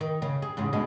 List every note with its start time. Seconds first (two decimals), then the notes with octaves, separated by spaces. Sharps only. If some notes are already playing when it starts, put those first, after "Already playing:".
0.01 D#3
0.22 C#3
0.42 G#4
0.57 E2 G#2 C#3
0.73 D2 B2 G#3